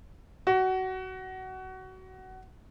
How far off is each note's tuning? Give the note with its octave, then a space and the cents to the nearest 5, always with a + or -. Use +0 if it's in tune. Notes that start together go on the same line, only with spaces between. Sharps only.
F#4 +20